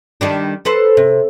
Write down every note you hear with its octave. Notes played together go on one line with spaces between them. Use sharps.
D#3 G3 D4
A4 B4 C5
C3